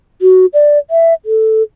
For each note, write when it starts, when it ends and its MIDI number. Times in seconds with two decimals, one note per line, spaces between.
0.22 0.46 66
0.54 0.78 74
0.91 1.14 76
1.25 1.63 69